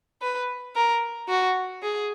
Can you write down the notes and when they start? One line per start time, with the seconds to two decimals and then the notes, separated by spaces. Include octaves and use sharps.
0.22 B4
0.76 A#4
1.29 F#4
1.83 G#4